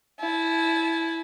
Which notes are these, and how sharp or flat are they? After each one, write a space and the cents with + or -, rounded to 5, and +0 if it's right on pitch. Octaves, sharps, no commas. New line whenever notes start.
E4 +0 A5 -40